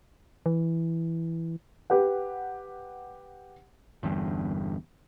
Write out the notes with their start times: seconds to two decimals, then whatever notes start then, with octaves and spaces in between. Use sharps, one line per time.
0.46 E3
1.90 G4 B4 F#5
4.03 G1 E2 G2